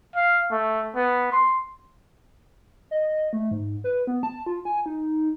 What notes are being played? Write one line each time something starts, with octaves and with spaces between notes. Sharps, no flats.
F5
A3
B3
C6
D#5
A3
G#2
B4
B3
A5
F4
G#5
D#4